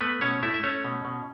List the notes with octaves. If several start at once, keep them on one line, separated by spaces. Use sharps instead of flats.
A3 B3 B4
B2 C#4 C#5
A3 E4 E5
E5
A3 C#4 C#5
B2
B2